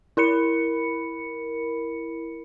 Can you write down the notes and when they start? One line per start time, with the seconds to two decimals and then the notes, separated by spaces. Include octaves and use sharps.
0.17 E4 A#4 B5 C#7